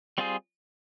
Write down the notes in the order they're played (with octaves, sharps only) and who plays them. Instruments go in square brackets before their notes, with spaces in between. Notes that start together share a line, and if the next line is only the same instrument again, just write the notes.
[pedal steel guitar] G3 C4 F4 G#4